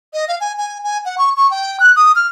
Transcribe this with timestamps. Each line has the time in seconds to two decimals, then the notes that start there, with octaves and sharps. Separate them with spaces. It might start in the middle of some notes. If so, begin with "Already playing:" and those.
0.14 D#5
0.28 F5
0.41 G#5
0.58 G#5
0.84 G#5
1.05 F#5
1.18 C#6
1.37 C#6
1.51 G5
1.80 F#6
1.96 D#6
2.15 F6